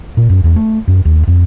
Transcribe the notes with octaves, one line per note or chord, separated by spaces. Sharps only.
A#2
F#2
E2
A3
F#2
D#2
F2